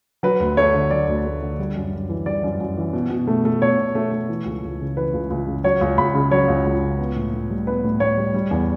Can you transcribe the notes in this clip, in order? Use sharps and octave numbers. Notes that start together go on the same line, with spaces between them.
F#3 B4
D2
A3 C#5
D3
F#3 D5
D2
A3
D3
G3
F#2
F#2
E3
G3 D5
F#2
F#2
E3
B2
B2
A3
A3
B2 C#5
B2
A3
A3
E3
C#2
C#2
C#3
E3 B4
C#2
C#2
C#3
F#3 C#5
C#2
C#2 B5
C#3
F#3 C#5
C#2
C#2
C#3
B3
A2
A2
G3
B3 B4
A2
A2 C#5
G3
G3
E2